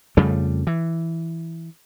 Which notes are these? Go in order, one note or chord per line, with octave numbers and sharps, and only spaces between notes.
F2 C#3 G3 A3
E3